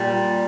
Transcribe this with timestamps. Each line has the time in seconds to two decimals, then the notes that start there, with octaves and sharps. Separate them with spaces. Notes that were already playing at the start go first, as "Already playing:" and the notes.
Already playing: A#2 G3